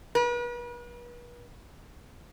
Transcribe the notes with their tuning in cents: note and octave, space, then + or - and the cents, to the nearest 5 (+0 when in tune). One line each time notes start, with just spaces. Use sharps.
B4 -40